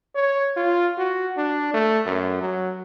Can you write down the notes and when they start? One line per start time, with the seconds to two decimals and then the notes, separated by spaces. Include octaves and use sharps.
0.15 C#5
0.57 F4
0.98 F#4
1.37 D4
1.74 A3
2.06 F#2
2.41 F#3